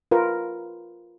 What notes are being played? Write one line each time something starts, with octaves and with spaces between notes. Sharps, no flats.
F4 A#4 B4